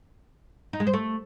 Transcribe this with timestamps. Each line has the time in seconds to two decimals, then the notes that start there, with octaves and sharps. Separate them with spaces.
0.73 D#4
0.80 G#3
0.87 C5
0.93 A3